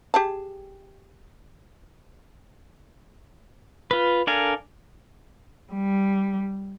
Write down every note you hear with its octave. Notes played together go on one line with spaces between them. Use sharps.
G4 G#4 A5
F4 B4
D4 A4 A#4 F5 G#5
G3